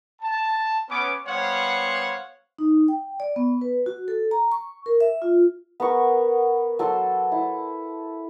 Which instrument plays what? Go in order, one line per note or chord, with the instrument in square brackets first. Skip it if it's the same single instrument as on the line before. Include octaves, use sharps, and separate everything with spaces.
[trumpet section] A5
B3 C#4 D6
G3 B3 C5 C#5 F5 F#5
[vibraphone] D#4
G5
D5
B3
B4
F#4
A4
A#5
C#6
A#4
E5
F4
[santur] B3 A#4 C#6
F#3 A4 C6
E4